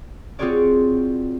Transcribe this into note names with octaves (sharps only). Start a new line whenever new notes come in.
C4 F4 F#4 G#4 C#5 D5